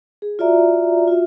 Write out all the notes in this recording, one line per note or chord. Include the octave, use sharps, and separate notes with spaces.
G#4
F4 F#4 D5 E5 A#5
F4 F#4 E5